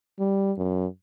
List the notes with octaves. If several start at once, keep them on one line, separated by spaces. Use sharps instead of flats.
G3
F#2